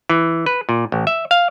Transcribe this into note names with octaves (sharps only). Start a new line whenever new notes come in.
E3
B4
A#2
A1
E5
F5